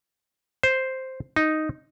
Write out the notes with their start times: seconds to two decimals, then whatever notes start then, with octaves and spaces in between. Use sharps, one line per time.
0.63 C5
1.36 D#4